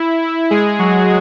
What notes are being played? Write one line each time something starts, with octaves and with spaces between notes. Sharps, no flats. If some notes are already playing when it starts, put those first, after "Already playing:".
Already playing: E4
E4
G#3 G#4
F#3 F#4